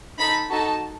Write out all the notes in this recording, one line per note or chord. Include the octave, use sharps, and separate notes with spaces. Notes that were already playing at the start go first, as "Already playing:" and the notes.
D#4 A4 B5
D#4 F#4 A4 A5